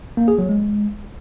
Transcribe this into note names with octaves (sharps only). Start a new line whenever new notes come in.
A#3
G#4
F#3
G#3